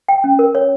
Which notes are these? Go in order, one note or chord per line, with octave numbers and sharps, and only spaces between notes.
G5
C#4
A#4
C#5